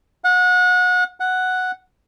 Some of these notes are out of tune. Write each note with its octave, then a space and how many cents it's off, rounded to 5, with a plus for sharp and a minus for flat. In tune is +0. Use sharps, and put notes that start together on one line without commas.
F#5 -30
F#5 +0